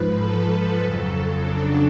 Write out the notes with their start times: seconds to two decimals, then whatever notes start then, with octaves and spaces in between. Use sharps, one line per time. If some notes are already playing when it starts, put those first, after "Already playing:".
Already playing: G#2 F3 B4
0.18 A4
0.49 B4
0.80 F2 C#3 F#3 A4
1.40 D4